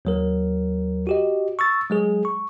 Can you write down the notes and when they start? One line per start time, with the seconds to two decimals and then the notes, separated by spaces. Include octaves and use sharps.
0.05 D#2 F#3 A#4
1.07 F#4 G4 D#5
1.59 C#6 E6 A6
1.90 F#3 G#3 G#4
2.25 C#6